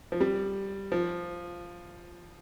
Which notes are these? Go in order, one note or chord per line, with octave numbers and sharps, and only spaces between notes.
F3
G3
F3